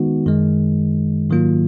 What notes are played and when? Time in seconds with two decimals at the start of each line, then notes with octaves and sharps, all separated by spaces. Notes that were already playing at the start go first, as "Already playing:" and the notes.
Already playing: D#3 G#3 B3 D#4 F#4
0.26 F#2 D#3 G#3
1.30 G#2 D#3 F#3 A#3 F4